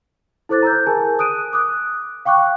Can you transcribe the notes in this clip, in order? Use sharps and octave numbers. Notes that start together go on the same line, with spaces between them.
E4 A4 C5 D6 F#6 A6
A#5 E6 G6
G#4 A#4 G#5 A5
D#6 F#6 D7 D#7
D6 D#6 F#6
F5 G5 C#6 D6 F#6